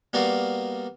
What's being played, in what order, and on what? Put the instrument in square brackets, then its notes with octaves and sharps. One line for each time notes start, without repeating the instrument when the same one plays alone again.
[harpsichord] G3 A#3 B3 F#4 D5 F5